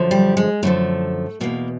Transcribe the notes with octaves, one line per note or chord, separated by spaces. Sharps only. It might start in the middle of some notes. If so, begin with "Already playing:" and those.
Already playing: F#2 D3 F3
G3
G#3
F#2 D3 F3 A3
E2 B2 A#3